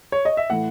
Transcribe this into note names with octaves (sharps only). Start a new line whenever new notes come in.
C#5
D#5
E5
A2 E3 A3 E4 F#5